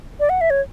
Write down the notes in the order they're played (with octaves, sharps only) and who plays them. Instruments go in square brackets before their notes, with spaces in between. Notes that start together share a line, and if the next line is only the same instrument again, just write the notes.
[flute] D5
F#5
E5
C#5